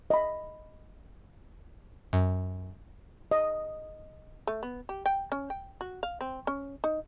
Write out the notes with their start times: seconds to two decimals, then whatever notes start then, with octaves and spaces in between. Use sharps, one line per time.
0.10 D#5 B5
2.13 F#2
3.31 D#5
4.47 A3
4.63 B3
4.89 G4
5.06 G5
5.32 C#4
5.50 G5
5.81 F#4
6.03 F5
6.21 C4
6.47 C#4
6.84 D#4